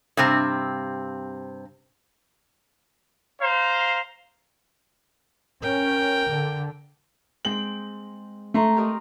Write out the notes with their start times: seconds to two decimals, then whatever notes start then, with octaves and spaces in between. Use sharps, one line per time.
0.17 G2 C3 C4
3.42 C5 F5 A#5
5.62 C#4 A#4 G5
6.30 D3
7.45 G#3 C4 G5 F#7
8.54 A3 A#5 C6 C#6
8.77 G4 A#4 D#5